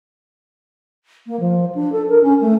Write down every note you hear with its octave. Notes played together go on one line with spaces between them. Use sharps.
A#3
F3
D4
A4
A#4
C#4
A3